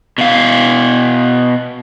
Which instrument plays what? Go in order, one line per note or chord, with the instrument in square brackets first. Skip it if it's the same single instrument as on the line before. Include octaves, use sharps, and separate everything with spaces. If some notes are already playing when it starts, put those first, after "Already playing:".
[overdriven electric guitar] B2 F5